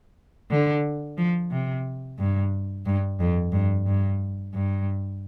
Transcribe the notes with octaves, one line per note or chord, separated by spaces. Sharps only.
D3
F3
C3
G2
G2
F2
G2
G2
G2